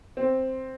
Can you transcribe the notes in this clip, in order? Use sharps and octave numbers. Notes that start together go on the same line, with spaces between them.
C4